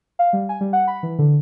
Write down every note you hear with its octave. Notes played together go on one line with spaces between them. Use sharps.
F5
G3
G#5
G3
F#5
B5
E3
D3